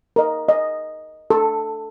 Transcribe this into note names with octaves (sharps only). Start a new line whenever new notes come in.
A#4 D#5
D#5
A4